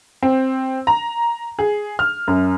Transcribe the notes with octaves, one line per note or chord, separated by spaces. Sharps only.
C4
A#5
G#4
F6
F#2